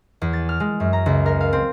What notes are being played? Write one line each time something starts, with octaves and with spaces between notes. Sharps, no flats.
E2
A6
F6
G#3
F#2
A#5
C#2
A#4
F5
C4